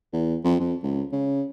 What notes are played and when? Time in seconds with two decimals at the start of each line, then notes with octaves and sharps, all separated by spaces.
0.13 E2
0.44 F2
0.60 F2
0.83 C#2
1.12 C#3